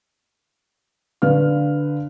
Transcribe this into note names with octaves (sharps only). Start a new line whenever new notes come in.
D3 B4 F5 F6